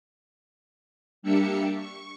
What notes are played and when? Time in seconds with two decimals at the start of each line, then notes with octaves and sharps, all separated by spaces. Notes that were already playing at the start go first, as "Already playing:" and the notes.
1.22 G3 A#3 D4 G4 E5 C#7
1.76 C#6